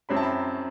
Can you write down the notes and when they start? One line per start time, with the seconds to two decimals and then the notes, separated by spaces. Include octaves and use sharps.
0.09 F#2 F#3 C4 E4 B5
0.17 A5
0.23 B5